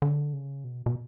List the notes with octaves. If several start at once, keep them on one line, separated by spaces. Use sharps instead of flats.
D3
C#3
B2
B2